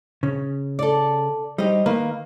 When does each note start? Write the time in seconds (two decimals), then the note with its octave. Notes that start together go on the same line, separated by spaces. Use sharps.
0.23 C#3 C#4
0.79 A4 D5
1.58 G3 D#4 G4 C5 D#5
1.86 D#3 A#3 B4